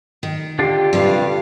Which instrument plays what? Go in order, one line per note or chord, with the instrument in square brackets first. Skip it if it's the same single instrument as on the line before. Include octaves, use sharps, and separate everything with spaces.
[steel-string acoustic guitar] D#3
[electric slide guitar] D3 D4 F4 [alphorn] G4
[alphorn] G2 [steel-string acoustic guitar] C3 G3 F5